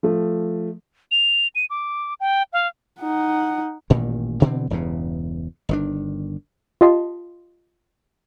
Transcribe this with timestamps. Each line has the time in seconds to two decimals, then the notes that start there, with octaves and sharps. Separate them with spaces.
0.03 F3 A3
1.11 F7
1.55 D#7
1.70 D6
2.20 G5
2.53 F5
3.01 D#4 F#5
3.90 A1 G2 A#2 D#3
4.42 B2 D3 E3 C4
4.70 E1 E2 G2 C#3
5.69 G1 D#3 D4
6.81 F4 G4 D#5 A5 C6